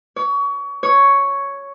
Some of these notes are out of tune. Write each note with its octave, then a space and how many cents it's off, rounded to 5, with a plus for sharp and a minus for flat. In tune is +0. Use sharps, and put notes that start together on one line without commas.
C#5 +30
C#5 +5